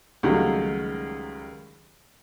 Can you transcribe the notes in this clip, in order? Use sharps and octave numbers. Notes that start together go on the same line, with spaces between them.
C#2 D#3 F#3 G3 A3